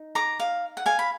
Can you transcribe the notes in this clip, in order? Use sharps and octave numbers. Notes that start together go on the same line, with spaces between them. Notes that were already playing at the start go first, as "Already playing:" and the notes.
Already playing: D#4
A#5 D6
F5
F#5
F5 G#5
B5